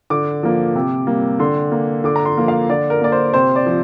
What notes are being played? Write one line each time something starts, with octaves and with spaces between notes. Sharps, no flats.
D3 D6
F3 A#3
C3
G3 A#3
D3 C6
A#3
D3 D6
A#5
C6
F3 A#3
F5
D3 D5
A#4
A#3 D5
C5
C3 C5
D5
F3